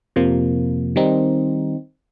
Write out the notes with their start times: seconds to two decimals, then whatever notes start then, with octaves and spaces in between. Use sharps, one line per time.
0.16 F2 C3 F3 A#3
0.96 D#3 G3 C4 D#4